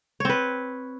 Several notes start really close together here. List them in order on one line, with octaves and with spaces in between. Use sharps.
C#5 C4 B4